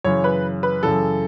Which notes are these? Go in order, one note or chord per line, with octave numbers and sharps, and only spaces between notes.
F#2 C#3 E3 C#5
B4
B4
F#2 C#3 E3 A4